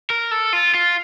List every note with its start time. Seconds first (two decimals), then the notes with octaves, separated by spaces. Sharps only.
0.10 A#4
0.31 A4
0.53 F4
0.74 F4